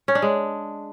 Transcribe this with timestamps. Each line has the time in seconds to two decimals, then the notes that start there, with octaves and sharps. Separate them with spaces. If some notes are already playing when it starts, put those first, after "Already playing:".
0.08 C#4
0.15 D4
0.22 G#3